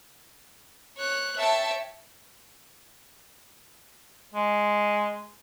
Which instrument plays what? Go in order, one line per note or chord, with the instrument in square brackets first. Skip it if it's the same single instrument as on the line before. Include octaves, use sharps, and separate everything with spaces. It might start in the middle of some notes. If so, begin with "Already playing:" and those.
[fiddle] C#5 F#6
[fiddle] C#5 G5 [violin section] E5 A5
[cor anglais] G#3